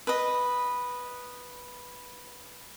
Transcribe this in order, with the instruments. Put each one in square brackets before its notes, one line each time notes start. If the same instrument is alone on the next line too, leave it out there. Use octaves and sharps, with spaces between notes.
[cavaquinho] B4 D#5